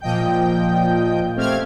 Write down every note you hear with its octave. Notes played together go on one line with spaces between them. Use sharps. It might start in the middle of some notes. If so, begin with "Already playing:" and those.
A#2 F3 D#5 G5 G6
A3 C4 G4 F5 F6 G#6